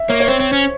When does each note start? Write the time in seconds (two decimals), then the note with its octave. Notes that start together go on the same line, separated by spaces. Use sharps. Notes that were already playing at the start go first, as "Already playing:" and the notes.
Already playing: E5
0.09 A#3 C#5
0.20 C#5
0.27 C4 C5
0.40 C4
0.53 C#4